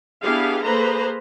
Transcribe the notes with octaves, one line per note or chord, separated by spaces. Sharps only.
B3 D4 E4 G4 G#4 F5
A#3 G#4 A4 B4 C5 A#5